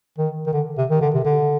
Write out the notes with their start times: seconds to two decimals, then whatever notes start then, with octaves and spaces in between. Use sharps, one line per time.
0.19 D#3
0.47 D#3
0.53 D3
0.78 C3
0.90 D#3
1.01 D3
1.15 C3
1.25 D3